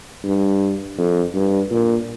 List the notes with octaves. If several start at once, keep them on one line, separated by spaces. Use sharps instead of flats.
G2
F2
G2
A#2